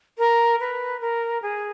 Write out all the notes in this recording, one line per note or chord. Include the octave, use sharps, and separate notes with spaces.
A#4
B4
A#4
G#4